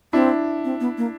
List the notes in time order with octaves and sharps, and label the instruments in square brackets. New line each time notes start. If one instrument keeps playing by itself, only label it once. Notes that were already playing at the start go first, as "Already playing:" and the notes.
[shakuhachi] C4 [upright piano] D4 E4
[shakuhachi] C4
B3
A#3